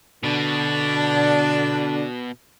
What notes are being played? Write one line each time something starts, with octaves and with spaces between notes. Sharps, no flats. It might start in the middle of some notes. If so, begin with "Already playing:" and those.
B2 D3 D4